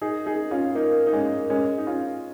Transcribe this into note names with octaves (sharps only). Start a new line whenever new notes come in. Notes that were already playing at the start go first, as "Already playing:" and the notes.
D#4 G#4
D#4 G#4
C#4 F4
A#3 D#4
D#4
G#3 C#4
G#3 C#4
D#4
C#4 F4